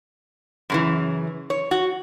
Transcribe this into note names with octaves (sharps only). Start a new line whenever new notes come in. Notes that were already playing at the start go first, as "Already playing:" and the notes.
F#2 C#3 E3
C#5
F#4